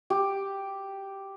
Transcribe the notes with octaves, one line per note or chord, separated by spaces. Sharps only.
G4